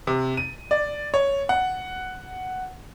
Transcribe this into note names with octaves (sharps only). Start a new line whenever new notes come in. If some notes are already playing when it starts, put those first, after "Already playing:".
C3
D#7
D5
C#5
F#5